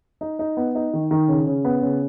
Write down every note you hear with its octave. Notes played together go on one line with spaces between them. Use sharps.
D#4
D#4
B3
D#4
D#3
D#3
C#3
C#3
B3
C#3